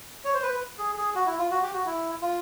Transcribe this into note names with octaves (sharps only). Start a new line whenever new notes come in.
C#5
C5
B4
G#4
G#4
F#4
E4
F4
F#4
G4
F#4
E4
F4